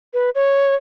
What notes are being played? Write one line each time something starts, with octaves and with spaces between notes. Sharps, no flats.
B4
C#5